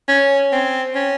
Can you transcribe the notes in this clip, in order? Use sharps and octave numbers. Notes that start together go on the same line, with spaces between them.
C#4
C4
C#4